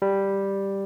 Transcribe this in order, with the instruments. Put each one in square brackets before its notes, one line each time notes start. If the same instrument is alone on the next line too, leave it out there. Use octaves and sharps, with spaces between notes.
[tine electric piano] G3